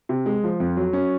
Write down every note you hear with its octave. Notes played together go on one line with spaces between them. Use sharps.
C3
G#3
F3
F2
F#3
C#4